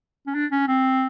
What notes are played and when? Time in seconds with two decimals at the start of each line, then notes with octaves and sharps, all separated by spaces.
0.27 C#4
0.35 D4
0.52 C#4
0.68 C4